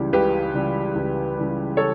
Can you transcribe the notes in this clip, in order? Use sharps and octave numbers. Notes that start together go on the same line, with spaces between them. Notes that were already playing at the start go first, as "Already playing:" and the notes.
Already playing: C#2 C#3 E3 G3 G4
C#2 G4 B4
C#3 E3 G3
C#2
C#3 E3 G3
A4 C#5